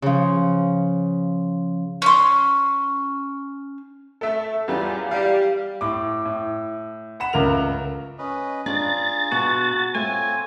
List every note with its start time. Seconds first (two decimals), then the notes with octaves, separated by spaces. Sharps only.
0.02 C#3 F3
2.02 C#4 C6
4.21 A3 A4 E5
4.68 E2 E3 F#3 G3 F4
5.11 G3 F5
5.81 A2 D6
6.25 A2
7.20 F#5 B5 E7
7.33 C#2 A3 A#4 F7
8.19 C#4 B4 D#5
8.66 D4 F4 G#4 A#5 A6
9.32 B2 F#4
9.95 A3 C4 F4 C#5 G#5